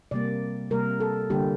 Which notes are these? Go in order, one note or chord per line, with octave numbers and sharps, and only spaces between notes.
C3 G3 A#3 D5
C3 G3 A#3 A#4
A4
D3 G3 A#3 G4